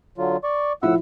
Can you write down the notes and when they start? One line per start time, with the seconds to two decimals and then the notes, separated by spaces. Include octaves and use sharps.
0.18 D3 F#3 F4
0.44 D5 C#6
0.83 A2 F3 E4 F#5 E6